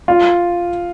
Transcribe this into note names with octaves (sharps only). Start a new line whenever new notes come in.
F4